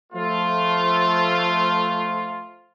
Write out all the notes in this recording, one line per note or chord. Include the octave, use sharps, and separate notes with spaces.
F3 A3 F4